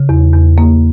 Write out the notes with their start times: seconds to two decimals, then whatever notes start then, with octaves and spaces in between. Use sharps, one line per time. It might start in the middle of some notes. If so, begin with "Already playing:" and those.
Already playing: C#3
0.09 E2
0.33 E2
0.58 A#3